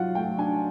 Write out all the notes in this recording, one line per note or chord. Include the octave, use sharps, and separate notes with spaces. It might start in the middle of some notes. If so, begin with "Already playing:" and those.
Already playing: F#3 F4 F#5
A3 G5
D4 G#5